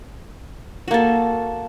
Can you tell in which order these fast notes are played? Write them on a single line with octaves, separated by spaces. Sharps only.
F#4 A#3 A4